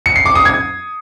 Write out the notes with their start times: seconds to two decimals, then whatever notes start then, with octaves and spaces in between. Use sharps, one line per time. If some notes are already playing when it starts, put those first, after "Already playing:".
0.06 C#7
0.16 C7
0.26 D6
0.35 D#6
0.45 G#6